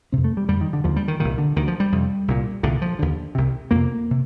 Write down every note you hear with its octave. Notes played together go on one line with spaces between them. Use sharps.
F2 C3 C4
A3
G3
F2 D3 G3
D#3
D3
D#2 D3 F3
G3
D#3
C2 A#2 D#3
D3
D2 D3 D#3
F3
G3
F2 C3
C2 A#2
C2 A#2 D3
F3
D#2 D3
C2 C3
F2 C3 A#3
C3